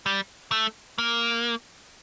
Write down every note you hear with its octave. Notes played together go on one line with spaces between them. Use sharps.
G3
A3
A#3